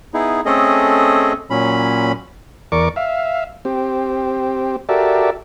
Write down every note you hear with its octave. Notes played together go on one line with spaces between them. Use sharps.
B3 D#4 E4 G#4
A3 C4 C#4 G#4 A4 D#5
A#2 F#3 C#4 B5
E2 A#4 D5 C#6 D6
E5 F5
C4 G4
F#4 G4 A4 A#4 D5 E5